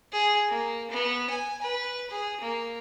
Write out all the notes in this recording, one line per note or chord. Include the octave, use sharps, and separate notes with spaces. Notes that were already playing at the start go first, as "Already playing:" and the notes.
G#4
A#3
B3
G#5
B4
G#4
A#3